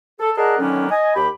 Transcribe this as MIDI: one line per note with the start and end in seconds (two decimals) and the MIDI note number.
0.20 0.31 69
0.37 0.58 68
0.37 0.58 70
0.37 0.58 74
0.37 0.58 75
0.37 0.58 78
0.37 0.58 81
0.59 0.89 50
0.59 0.89 51
0.59 0.89 54
0.59 0.89 58
0.59 0.89 59
0.59 0.89 61
0.90 1.12 75
0.90 1.12 80
1.15 1.28 39
1.15 1.28 67
1.15 1.28 83